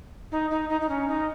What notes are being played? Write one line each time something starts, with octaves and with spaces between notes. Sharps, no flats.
D#4
D#4
D#4
D#4
C#4
D#4